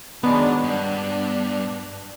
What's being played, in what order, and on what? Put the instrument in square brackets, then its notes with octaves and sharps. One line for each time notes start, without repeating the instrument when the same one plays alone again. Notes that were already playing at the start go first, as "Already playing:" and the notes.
[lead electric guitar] D#3 [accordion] F#3 G#3 D4 [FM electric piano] B3
[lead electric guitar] G2 [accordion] D4